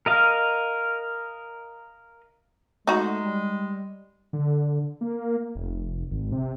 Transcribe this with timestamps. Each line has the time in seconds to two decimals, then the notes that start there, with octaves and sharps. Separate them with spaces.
0.06 A#4 D#5 F5
2.87 G#3 A3 D#4 F#4
3.22 G3
4.33 D3
5.01 A#3
5.55 F1
6.11 G#1
6.32 C3